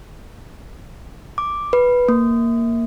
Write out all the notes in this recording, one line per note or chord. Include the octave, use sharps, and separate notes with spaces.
D6
B4
A#3